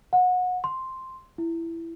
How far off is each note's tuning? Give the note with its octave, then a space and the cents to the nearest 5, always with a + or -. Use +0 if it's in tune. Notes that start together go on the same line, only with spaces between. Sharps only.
F#5 -25
C6 +0
E4 +10